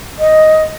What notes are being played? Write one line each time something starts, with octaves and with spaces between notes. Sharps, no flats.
D#5